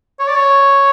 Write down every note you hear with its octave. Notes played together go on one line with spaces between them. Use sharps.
C#5
D5
C#5